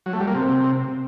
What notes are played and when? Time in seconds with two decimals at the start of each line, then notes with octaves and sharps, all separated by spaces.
0.06 F#3
0.13 A3
0.20 G3
0.27 A#3
0.35 C3